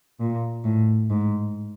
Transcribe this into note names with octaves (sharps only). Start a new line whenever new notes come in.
A#2
A2
G#2